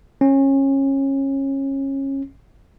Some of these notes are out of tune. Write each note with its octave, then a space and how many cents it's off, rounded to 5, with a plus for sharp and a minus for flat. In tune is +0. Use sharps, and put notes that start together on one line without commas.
C#4 -25